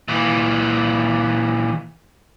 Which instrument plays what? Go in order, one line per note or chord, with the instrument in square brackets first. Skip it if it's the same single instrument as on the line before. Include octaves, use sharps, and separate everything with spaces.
[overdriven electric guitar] A#2 E3